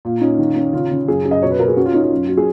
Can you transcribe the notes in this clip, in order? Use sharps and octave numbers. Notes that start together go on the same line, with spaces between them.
A#2
C#4 D#4
D#3
C#4
C#3 F4
C#3
F#2 G#4
F#2
D#5
B2 C#5
B4
B2 A#4
G#4
C#4 F#4
F4
C#4 D#4
F4
F#2
F#3
G#4